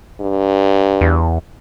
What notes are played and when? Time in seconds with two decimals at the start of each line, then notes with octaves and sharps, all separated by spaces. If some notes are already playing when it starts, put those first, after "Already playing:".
0.21 G2
1.01 E2